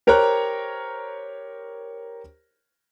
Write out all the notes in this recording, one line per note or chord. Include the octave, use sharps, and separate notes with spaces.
G4 A#4 C5 C#5 A#5 F#6